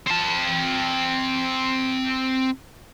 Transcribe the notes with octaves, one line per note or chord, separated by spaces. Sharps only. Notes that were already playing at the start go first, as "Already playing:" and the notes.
C4 A5